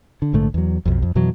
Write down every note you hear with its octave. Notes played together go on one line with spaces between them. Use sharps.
D3
A#1 G#2 D3 A3
E2 F#3
B1 F2
F2
F2 B2 E3 F#3